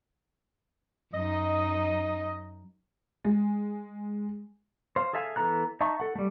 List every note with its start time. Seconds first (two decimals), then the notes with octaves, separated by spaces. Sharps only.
1.14 F#2 D#4 D#5
3.24 G#3
4.96 C5 F5
5.13 G#4 A4 E5 F5 G#5
5.36 E3 B3 A4 A#5 F#6
5.81 D#4 E5 A5 C#6
6.00 A4 F#5
6.15 G3 A3